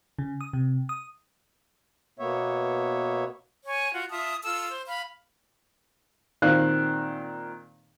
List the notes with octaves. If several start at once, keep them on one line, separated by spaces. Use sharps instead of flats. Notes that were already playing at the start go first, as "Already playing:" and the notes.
C#3
D#6
C3
D#6
B2 A#3 B3 C#5 E5
C#5 G#5
F4 F#4
F4 E5 A5 D#6
F4 A4 E6
C5
F5 B5
A#2 D#3 C4 F5 F#6